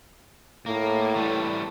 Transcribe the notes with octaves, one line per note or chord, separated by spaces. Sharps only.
A2 A#3
E3 G3 A3